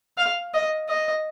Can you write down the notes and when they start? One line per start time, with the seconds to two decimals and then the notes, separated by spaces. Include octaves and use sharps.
0.18 F5
0.54 D#5
0.89 D#5